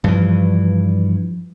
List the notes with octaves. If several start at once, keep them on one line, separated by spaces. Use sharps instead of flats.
G2 E3 F3